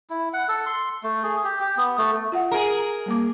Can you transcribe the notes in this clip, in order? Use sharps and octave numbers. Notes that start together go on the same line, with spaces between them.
E4
F#5
A4
C6
A3
G#4
G4
G4
B3
A3
F4 E5 F#5
G#4 A#4
G3 A#3 D6